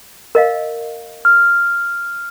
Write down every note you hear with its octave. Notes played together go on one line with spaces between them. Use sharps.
A#4 D#5 F5
F6